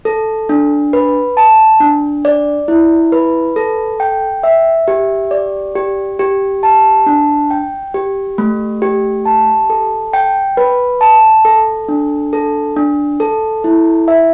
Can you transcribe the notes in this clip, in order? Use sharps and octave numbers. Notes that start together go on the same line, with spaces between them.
A4
D4
B4
A5
D4
D5
E4
B4
A4
G5
E5
G4
D5
G4
G4
A5
D4
G5
G4
A3
G4
A5
A4
G5
B4
A5
A4
D4
A4
D4
A4
E4
E5